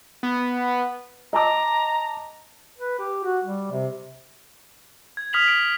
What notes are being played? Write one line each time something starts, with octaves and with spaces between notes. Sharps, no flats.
B3
D#5 A5 A#5 D6
B4
G4
F#4
G3
C3
G#6
D#6 F6 B6 F7 F#7
D7